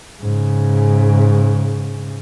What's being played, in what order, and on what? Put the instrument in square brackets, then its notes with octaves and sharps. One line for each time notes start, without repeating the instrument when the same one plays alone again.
[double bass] G#2 C#3